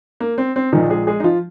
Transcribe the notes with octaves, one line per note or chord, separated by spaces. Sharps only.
A#3
C4
C4
A#1 A#2 D#3 F3 D#4
G#3 G#4
G#3 G#4
D#4
F3 F4